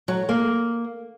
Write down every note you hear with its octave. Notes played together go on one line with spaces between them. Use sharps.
F#3
A#3